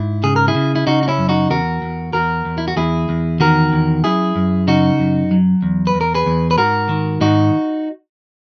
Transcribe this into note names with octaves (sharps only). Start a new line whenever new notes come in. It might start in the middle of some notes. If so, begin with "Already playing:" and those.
Already playing: G#2 E4
C#3 G#4
A#4
E4 G#4
C#3
E4
C#3 D#4 F#4
D#4
C#4 E4
F#2
D#4 F#4
E2 F#4 A#4
E2
E2 F#4 A#4
E2
E4
F#4
E2 E4 G#4
E2
D#3 F#4 A#4
E2
F#2 E4 G#4
F#2
C#3 D#4 F#4
F#2
F#3
E2
B4
E2
A#4
G#4 B4
E2
B4
G#2 F#4 A#4
D#3
G#2 D#4 F#4